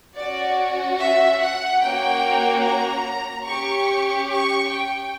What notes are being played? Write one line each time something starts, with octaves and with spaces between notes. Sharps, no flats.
C#4 F#4 D5
E5
F#5
A#3 C#4 F#4 G5
A#5
C#4 G4 C#6
C#6
G5